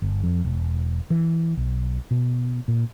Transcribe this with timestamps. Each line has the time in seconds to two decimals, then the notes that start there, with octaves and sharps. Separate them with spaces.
0.02 G1
0.24 F2
0.45 E1
1.10 E3
1.57 B1
2.11 B2
2.68 A#2